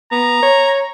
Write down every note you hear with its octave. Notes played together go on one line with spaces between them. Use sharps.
B3 A#5
C#5